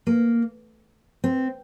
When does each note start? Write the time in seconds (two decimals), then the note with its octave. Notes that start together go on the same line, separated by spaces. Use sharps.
0.07 A#3
1.24 C4